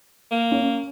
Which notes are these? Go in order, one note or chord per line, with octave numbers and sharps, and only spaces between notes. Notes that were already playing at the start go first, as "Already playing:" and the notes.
A#3
C#4